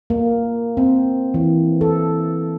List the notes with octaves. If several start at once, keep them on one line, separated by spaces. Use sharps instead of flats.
A#3
C4
E3
A4